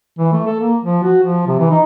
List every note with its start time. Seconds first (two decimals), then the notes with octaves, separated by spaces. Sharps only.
0.19 E3
0.32 A3
0.47 A4
0.60 A#3
0.84 F3
1.03 F#4
1.23 F3
1.47 C3
1.59 E3
1.71 D#4